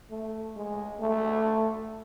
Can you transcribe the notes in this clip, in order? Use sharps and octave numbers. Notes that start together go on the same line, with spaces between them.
A3
G#3
A3